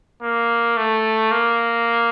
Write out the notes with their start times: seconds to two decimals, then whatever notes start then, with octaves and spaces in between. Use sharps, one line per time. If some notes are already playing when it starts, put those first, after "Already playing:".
0.22 A#3
0.77 A3
1.31 A#3